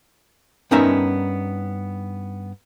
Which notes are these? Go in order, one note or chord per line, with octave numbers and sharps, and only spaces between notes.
G2 B3 C#4 D#4 A#4 E5